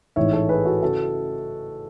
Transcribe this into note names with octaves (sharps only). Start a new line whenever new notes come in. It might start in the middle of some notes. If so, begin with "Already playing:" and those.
A1 G#2 E3 C#5 E5
A4 C#5
G#4 B4
F#4 A4
C#3 F#4 A4